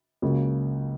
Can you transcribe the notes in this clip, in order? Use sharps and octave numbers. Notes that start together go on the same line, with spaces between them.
C#2 C#3 F#3 A#3